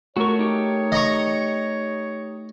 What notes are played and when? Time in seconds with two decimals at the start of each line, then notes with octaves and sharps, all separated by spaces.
0.17 A3 F#4 A4 A#4 C#5 C#6
0.39 D#4 G4
0.92 D#5 A#5 C#6